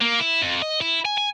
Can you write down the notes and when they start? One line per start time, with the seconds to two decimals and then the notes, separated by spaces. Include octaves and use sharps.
0.01 A#3
0.19 E4
0.42 F2
0.62 D#5
0.81 E4
1.05 G#5
1.18 G#5